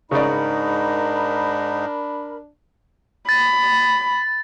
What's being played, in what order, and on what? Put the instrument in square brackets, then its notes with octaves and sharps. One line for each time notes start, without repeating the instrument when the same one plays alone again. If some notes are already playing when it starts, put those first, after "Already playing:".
[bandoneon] G#2 D#4 [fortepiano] C#3 D5 [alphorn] D4 [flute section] A#4 B5
[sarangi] B5 [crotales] A6